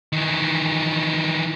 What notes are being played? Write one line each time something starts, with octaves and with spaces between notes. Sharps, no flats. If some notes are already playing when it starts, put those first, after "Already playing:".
D#3 E3